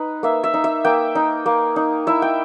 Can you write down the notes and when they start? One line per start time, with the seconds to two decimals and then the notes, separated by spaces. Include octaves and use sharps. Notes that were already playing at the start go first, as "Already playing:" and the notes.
Already playing: D#4 B4
0.23 A#3 E5
0.44 E5
0.54 D#4
0.64 E5
0.84 A#3 G5
1.15 D#4
1.46 A#3
1.76 D#4
2.07 E4 E5
2.22 G5